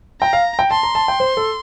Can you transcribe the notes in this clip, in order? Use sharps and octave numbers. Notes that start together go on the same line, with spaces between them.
G5 A#5
F5
G5
A5 C6
A#5
A5
G5
C5
A4